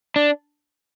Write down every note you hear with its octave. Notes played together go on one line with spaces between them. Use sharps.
D4